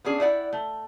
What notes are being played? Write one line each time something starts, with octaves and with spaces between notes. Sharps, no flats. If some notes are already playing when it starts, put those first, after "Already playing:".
B3 C#4 D4 G#4
E4 D5 F#5 G5
A3